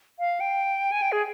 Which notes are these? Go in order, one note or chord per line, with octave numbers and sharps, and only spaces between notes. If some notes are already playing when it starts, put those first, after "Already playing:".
F5
G5
G#5
G5
G#4